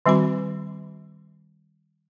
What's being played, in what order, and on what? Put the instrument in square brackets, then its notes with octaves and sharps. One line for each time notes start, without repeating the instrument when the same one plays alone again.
[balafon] D#3 G3 C4 F#4 B5